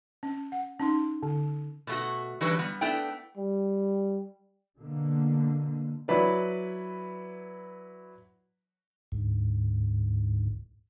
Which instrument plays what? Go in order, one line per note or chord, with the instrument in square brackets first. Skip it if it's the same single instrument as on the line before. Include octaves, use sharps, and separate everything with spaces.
[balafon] C#4
F#5
C#4 D#4 C6
D3
[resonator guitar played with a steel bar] B2 A3 F#4
E3 F#3 G3 D4 F#4 B4
G3 B3
A3 B3 D4 E4 G5
[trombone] G3
[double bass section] B2 D3 A#3
[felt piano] F#3 E4 B4 D5
[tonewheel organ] D2 G#2